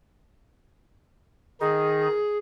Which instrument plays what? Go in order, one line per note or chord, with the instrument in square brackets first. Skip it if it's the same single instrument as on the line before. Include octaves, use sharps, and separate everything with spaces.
[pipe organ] D#3 D#4 [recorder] G#4